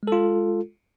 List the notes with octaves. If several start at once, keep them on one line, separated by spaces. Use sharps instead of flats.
G#3 F4 A4